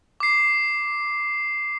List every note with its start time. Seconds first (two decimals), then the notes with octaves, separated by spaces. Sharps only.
0.20 D6 C7